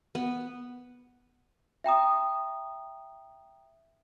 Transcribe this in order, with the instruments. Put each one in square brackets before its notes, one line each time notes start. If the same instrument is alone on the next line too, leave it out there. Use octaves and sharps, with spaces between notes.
[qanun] B3
[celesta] E5 G5 A#5 D#6